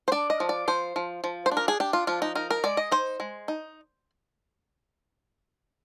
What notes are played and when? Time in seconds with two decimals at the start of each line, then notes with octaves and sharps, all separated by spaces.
0.08 C5
0.12 D4 D5
0.30 D#5
0.40 F3
0.49 D5
0.68 F3 C5
0.96 F3
1.24 F3
1.46 C5
1.52 D4
1.57 A#4
1.68 G#4
1.80 D4 G4
1.93 F4
2.07 F3 F4
2.22 D#4
2.35 D#4 A#4
2.50 A#4
2.64 G#3 D5
2.77 D#5
2.91 D#4 C5
3.20 G#3
3.48 D#4